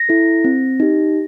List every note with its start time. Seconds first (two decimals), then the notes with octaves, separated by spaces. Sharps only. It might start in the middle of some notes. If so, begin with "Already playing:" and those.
Already playing: A#6
0.09 E4 A4
0.44 C4
0.80 D#4 G4